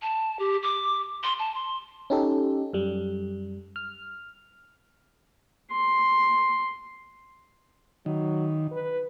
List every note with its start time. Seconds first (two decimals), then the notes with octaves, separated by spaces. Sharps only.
0.02 A5
0.39 G4
0.63 D6
1.23 C6
1.39 A5
1.55 C6
2.10 C#4 D#4 G4 A4
2.73 F#2 G3
3.76 F6
5.71 C6
8.06 D#3 F#3
8.72 B4